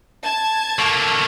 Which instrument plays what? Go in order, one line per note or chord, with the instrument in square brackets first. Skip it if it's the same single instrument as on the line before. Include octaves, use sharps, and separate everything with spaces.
[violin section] A5 G#6
[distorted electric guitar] A3 A#3